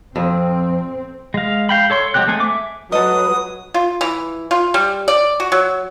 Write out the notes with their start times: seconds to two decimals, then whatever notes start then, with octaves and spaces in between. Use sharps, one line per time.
0.16 F2 C4
1.34 G#3 F5
1.69 F5 G5 B5
1.90 A4 C#5 C6
2.14 F#3 G#3 C4 G4 F#6
2.27 G#3 A3 C4 G#5
2.40 E5 D6
2.92 F#3 A4 B4 D#5 D#6
3.74 F4
4.01 E3
4.51 F4
4.74 G3
5.08 D5
5.40 F#4
5.52 F#3